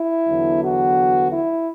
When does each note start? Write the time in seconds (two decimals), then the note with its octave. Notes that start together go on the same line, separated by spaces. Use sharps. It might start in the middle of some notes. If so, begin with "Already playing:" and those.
Already playing: E4
0.27 E2 D3 F#3 B3
0.61 F#4
1.30 E4